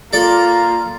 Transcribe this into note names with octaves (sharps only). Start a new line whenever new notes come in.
A#3 F4 A4 D5